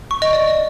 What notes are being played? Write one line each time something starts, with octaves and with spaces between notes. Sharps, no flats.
C#6
D#5
D5